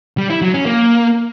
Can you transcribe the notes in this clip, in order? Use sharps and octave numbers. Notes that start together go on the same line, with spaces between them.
G3
E4
F#3
C#4
A#3